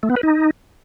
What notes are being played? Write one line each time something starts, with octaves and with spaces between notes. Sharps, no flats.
A3
B3
B4
D#4